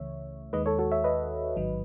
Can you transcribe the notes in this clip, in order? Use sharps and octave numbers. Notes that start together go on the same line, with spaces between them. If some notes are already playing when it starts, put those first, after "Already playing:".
Already playing: C#2 C#3 E3 A3 C#5 E5
D#2 D#3 G#3 B4 D#5
A4 C#5
F#4 A4
C#5 E5
B4 D#5
A1 G#2 D#3 F#3